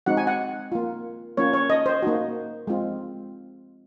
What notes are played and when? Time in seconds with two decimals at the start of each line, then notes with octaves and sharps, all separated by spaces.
0.06 G#3 C4 D#4 F#4 F#5
0.17 G#5
0.27 F#5
0.72 A#3 F4
1.37 A#3 C#4 F4 C#5
1.53 C#5
1.70 D#5
1.86 C5
2.02 A#3 D#4 F#4
2.67 G#3 C4 F4